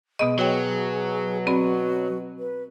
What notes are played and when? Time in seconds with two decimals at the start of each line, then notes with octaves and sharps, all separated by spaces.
0.19 B2 G#3 B3 D#5
0.39 B2 F#3 G#4 C#5 G5
1.47 C4 F#4 D5 B5
2.39 B4